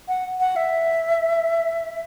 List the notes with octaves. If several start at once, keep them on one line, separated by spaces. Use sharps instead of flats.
F#5
F#5
E5